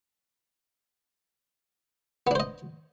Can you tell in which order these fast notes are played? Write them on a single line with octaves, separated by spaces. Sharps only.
B3 D4 C5 D#5